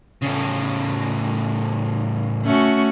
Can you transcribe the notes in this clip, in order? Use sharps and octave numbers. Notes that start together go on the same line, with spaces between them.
A2 C#3
A3 C#4 F#4